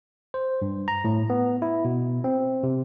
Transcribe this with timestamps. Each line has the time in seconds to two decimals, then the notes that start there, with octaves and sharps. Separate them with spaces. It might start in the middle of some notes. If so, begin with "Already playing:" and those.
0.34 C5
0.62 G2
0.88 A#5
1.05 A2
1.30 B3
1.62 E4
1.85 B2
2.24 C4
2.63 C3